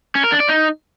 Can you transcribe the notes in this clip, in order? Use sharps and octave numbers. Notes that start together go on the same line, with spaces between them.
C#4
A#4
D4
D5
D#4